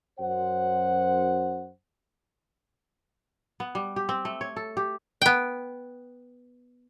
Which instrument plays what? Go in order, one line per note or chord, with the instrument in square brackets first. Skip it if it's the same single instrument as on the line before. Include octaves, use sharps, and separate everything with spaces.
[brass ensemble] F#2 C5 F#5
[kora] B3
G3
G4
C4
A3
C#5
A4
G4
[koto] B3 G5